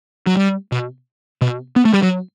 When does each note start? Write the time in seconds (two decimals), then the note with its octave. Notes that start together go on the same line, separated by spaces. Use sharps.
0.27 F#3
0.36 G3
0.72 B2
1.41 B2
1.76 B3
1.85 A3
1.93 G3
2.03 F#3